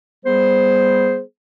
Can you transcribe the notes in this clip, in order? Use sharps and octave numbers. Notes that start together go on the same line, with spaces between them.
G3 B3 G#4 C5